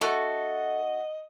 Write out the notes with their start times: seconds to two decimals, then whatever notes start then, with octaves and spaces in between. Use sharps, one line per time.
0.01 D3 A3 F#4 A4 D#5